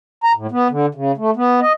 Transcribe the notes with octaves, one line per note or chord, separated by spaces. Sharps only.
A#5
A2
B3
D3
C#3
A3
B3
D#5